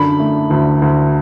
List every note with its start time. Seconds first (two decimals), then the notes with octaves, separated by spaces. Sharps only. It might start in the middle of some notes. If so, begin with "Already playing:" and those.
Already playing: F#2 D3 B5
0.20 A3
0.50 D2
0.82 D2